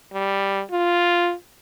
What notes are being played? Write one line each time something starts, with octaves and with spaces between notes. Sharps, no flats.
G3
F4